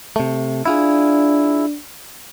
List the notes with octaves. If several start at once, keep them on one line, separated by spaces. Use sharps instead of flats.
C3 A3
D4 E4 F4 G#4